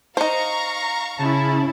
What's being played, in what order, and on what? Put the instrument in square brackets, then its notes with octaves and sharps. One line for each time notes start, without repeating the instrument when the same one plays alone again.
[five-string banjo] D#4 C5 [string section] F5 A#5 C#6
[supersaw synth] C#3 A5 [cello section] C#4 E4